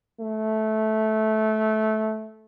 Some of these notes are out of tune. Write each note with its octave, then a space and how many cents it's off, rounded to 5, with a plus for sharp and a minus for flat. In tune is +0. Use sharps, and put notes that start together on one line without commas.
A3 -15